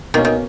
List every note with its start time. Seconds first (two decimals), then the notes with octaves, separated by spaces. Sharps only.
0.14 B2 D#3 A#3 C#4
0.25 D#3